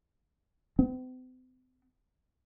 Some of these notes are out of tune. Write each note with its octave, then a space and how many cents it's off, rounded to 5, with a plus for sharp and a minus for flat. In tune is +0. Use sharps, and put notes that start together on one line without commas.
C4 -45